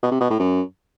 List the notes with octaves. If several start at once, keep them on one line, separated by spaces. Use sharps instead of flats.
B2
C3
B2
A2
F#2